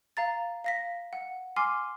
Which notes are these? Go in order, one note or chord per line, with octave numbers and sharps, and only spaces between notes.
F5 A#5 A6
F5 A#6 B6
F#5
G#5 C6 D6 F6 C7